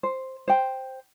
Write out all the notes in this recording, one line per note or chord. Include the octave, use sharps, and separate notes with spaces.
C5
C5 G5